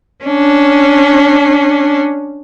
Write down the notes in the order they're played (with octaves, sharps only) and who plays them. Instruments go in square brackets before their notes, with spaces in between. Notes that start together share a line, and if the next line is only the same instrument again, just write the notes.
[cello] C#4 D4